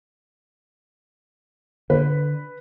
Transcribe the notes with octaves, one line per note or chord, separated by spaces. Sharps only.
D3 B4